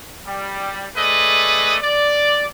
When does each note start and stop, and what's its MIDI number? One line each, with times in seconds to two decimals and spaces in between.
0.25 0.86 55
0.96 1.76 57
0.96 1.76 68
0.96 1.76 71
0.96 1.76 74
0.96 1.76 75
1.81 2.45 74